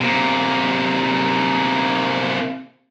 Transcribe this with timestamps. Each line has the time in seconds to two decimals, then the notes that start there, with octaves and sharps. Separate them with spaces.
0.01 C3 A#3